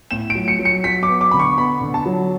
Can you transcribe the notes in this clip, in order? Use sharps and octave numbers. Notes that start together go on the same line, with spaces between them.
A2 E7
D7
F#3
C#7
F#3
C#7
F#3 B6
D6
B3
D6
D3 B5
C#6
B3 B5
D3
A5
F#3